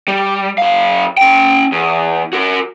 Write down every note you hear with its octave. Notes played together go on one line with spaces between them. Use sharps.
G3
F#2 F5
C#4 G5
E2
F#4 A#4